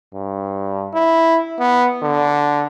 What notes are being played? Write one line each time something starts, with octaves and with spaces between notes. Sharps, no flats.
G2
E4
B3
D3